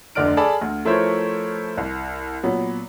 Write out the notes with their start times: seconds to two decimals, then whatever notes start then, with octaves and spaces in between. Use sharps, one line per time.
0.15 F1 D2 D3 D5 F6 D7
0.37 G#4 A4 D5 A5 B5
0.62 D2
0.85 F3 A3 E4 A#4 C5 C#5
1.77 C2
2.43 A#2 F#3 B3